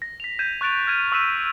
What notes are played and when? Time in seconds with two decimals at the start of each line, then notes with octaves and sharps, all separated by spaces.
0.02 A#6
0.20 B6 F7
0.39 G6 G#6 B6 D#7 E7
0.61 C#6 F#6 A6 D7 F7
0.87 F6 G#6 D#7
1.12 C#6 E6 F#6 B6 D#7 E7